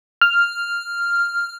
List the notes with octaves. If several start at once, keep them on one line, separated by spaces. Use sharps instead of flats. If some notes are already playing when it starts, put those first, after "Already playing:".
F6